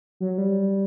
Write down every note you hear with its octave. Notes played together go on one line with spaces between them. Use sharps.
F#3
G3